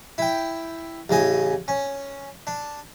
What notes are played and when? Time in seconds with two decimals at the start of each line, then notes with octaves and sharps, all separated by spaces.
0.18 E4 G5
1.09 A1 C#3 D#5 G#5
1.68 C#4
2.47 D4